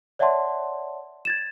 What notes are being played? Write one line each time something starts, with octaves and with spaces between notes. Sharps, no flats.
C#5 D5 E5 F#5 A5 C6
G#6 A6 E7